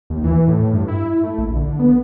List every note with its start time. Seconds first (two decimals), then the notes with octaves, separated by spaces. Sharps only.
0.10 D#2
0.24 E3
0.48 A2
0.73 G2
0.88 E4
1.23 A3
1.38 A#1
1.55 D3
1.79 B3